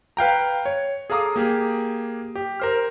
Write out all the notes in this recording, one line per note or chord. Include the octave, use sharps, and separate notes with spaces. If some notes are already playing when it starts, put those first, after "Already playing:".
B4 F5 G5 A#5
C#5
G#4 A4 F5 A#5 D6 D#6
A#3 G4 G#4
G4
A#4 C5 F6